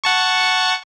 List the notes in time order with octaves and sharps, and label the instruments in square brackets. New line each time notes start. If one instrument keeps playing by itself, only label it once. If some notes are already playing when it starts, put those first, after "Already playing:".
[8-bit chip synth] F#5 A5 C#6